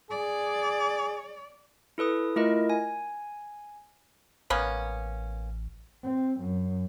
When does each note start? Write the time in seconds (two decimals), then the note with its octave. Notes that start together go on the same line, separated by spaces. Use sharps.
0.11 G#4 D5
1.98 E4 A4 B4 D#6
2.36 A3 E4 F4 A#4 D#5
2.70 G#5
4.50 A1 A#3 B3 C#4
6.03 C4
6.40 F#2